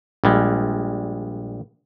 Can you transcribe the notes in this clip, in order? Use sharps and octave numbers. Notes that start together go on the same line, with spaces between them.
A#1 G3 G#3